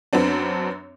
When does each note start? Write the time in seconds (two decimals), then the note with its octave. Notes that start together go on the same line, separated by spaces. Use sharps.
0.13 F#2 B3 C4 D4